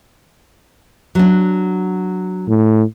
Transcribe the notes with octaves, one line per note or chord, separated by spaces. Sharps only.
F#3 D4
A2